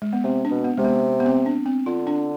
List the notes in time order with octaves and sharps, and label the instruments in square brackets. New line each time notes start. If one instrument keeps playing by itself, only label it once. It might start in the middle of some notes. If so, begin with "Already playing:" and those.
[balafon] G#3
B3
[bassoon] C3 [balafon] C4
[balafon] D4
[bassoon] B2
[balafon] B3
[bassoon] C3 [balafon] G#3
[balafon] B3
B3
C4
D4
C4
[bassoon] D3 [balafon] F4
[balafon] D4